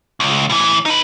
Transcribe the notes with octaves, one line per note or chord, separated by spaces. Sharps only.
C#2
A2 E3
D#4 B4